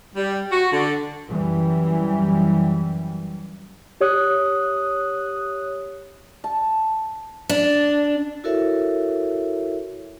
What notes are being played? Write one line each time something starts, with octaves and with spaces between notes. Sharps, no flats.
G3
F#4
D3
F#2 E3 G3
G4 C#5 D#6 F#6
A5
D4
E4 F#4 A4 A#4 C#5 E5